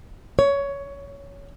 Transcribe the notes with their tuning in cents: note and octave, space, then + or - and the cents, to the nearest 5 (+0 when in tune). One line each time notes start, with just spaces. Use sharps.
C#5 +15